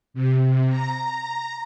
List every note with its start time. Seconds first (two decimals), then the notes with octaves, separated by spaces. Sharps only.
0.14 C3
0.69 A#5